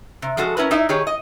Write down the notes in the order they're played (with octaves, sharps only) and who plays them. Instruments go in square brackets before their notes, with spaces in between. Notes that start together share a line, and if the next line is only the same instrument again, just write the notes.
[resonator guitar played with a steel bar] C3
F3 G#3 F#4 A4
C#4 E4 A#4 B4
D#4 E4 D5 E5
D#3 G4 G#4 C#5
D#5